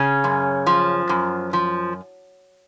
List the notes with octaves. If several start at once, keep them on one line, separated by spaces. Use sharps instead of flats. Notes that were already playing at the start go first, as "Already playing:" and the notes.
Already playing: C#3 C#4
F#2
F3
F#2
F3